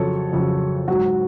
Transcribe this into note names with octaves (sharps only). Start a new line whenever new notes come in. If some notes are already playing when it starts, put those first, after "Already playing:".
Already playing: F2 C#3 F#3 A4 C#5
F2 C#3 F#3
G#2 F#3 F#4